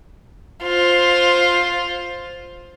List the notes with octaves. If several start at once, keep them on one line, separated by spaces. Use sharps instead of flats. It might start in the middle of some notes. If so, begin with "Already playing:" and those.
F4 C5